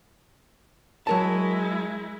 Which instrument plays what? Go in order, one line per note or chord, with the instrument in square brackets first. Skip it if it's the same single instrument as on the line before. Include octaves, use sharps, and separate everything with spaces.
[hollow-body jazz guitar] F#3 A#4 A5 [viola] G#3 E4